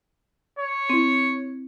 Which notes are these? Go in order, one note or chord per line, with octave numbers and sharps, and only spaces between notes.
C#5
C4 E4